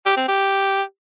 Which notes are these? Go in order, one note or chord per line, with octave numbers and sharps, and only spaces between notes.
G4
C4
G4